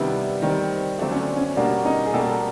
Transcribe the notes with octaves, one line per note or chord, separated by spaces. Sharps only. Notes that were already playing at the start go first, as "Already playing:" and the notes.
Already playing: C3 D#3 G3 B3 D4 E4
D#3 G3 C4
D3 F#3 A3 C4 D4
C#4
C#4
B2 G3 A#3 D4
C#4 D#4
G#4
B2 G3 A#3 G4 A4